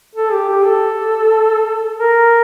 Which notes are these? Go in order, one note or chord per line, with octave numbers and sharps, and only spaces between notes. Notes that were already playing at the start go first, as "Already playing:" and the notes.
A4
G4
G4
A4
A#4